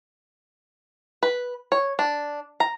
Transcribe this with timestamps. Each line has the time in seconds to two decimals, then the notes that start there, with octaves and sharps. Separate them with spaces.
1.23 B4
1.72 C#5
1.99 D4
2.60 A#5